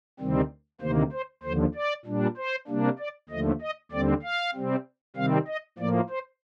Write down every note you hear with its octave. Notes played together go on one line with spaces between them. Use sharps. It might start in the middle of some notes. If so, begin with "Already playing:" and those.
D2 C3 D#3 G3 C4
D2 C3 D#3 A#3 C5
C5
D#2 D3 F3 C5
D5
A#2 G3 D4
C5
C3 G3 A#3 D4
D5
D#2 D3 F3 A3 D#5
D#5
D#2 D3 G3 C4 D5
F5
C3 G3 C4
C3 D#3 G3 C4 F5
D#5
A2 F3 A#3 D5
C5